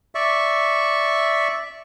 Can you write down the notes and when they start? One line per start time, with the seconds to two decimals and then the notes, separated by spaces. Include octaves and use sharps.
0.15 D5 E5 C#6